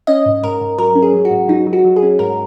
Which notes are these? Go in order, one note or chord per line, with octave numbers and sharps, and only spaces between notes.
C#4 D#5
G#2
G#2 A#4
G#2
F#3 A#4
C#4
G#4
F#3
F#4
G#2
F#3 D#4
F#3
F#4
F#3
G#4
C#4
G#2 A#4